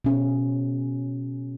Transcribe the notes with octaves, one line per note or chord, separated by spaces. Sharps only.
B2 C#4